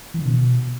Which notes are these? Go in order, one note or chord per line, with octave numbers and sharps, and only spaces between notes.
E3
D3
B2